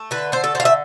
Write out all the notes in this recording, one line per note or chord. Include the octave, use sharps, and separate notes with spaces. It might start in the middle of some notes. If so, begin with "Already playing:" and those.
Already playing: A3
D3 B4
A3 C5
A4
D3 C5
F5
E5